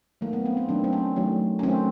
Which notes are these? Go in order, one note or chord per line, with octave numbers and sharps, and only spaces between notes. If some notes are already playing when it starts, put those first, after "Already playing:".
D#3 F#3 A3 A#3
B3
C4
C4
D#3 F#3 A3 D4
C4
C#4
D#3 F#3 A3
C#4
D#3 F#3 A3 C4